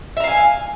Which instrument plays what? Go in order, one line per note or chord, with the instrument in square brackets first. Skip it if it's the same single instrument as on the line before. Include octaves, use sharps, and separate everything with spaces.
[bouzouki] E5
A#5
F5
G#5